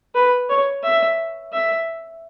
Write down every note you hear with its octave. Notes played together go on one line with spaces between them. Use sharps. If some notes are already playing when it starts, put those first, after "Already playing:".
B4
C#5
E5
E5